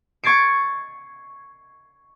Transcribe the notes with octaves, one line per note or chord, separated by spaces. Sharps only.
C#6 G#6 A6 C7 D7